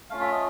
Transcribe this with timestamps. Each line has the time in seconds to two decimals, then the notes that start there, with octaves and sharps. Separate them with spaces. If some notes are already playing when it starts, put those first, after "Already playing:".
0.10 A3 C#4 F4 F5
0.20 E5
0.31 D#5